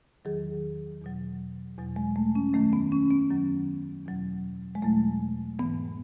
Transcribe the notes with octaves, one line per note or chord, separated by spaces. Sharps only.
E2 D#3 F#3 G#4
E2 B2 F#3
E2 B2 F#3
G#3
A3
C#4
F#2 D#3 F#3 A3
B3
C#4
B3
F#2 D#3 F#3
E2 B2 F#3
G#3
E2 B2 F#3 A3
G#2 E3 B3